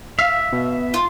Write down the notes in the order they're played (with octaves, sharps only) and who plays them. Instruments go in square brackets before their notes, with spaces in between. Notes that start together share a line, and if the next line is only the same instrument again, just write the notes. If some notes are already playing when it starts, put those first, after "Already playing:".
[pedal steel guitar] E5 [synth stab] F5
[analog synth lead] B2
[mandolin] F4